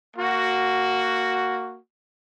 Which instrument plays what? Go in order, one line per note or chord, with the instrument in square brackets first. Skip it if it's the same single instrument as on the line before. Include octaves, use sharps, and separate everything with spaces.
[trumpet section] A#3 F#4